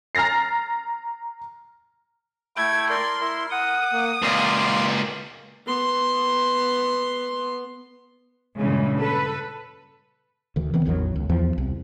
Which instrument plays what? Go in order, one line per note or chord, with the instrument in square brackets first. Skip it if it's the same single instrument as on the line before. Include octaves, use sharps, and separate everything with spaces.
[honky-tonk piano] A#5 F6 A6 A#6 C7
[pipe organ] A3 E4 G5 [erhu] G#6
[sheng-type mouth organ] A#4 D5 [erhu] C6
[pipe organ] E4 [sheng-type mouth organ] A#4
[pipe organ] F#5 [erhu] D#6
[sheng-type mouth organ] A#3
[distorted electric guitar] C#2 A#2 [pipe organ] D5 [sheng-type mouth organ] F5 C6
[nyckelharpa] B3 C6
[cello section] G2 A#2 C#3 E3 G#3
A4 B4
[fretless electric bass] D2 D#3
D#3 E3 B3 C4
A1 E2 D#3 F#3
C#2
E2 F3
C2